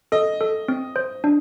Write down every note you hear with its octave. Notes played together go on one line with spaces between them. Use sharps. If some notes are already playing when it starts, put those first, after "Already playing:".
A4 D#5
A4
C4
C5
D4